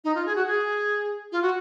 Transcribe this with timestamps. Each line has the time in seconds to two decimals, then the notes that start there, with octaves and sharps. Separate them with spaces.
0.04 D#4
0.15 F4
0.26 G#4
0.35 F#4
0.47 G#4
1.32 F4
1.42 F#4